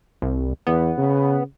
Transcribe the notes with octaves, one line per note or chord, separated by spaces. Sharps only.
C2
E2 B3
C#3